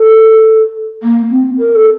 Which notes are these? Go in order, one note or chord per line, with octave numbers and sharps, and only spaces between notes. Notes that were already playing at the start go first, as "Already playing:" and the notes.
Already playing: A4
A#3
C4
A#4
A4